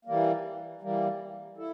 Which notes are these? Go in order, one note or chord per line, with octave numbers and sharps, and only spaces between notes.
E3 G3 A#3
E3 G3 A#3
E4 A4